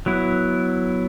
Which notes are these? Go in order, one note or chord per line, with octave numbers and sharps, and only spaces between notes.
F#3 B3 E4